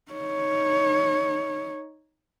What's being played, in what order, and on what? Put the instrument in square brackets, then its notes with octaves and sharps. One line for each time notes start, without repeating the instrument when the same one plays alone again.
[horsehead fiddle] D#4 C#5